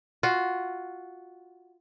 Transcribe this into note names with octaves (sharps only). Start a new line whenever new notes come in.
F4 F#4